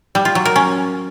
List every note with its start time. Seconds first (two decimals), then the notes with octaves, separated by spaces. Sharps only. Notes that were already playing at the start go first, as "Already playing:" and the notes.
0.15 G3
0.25 F4
0.35 F#3
0.45 A#4
0.56 C#4